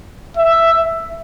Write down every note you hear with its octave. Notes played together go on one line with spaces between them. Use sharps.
E5